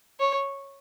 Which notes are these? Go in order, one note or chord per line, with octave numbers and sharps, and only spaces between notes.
C#5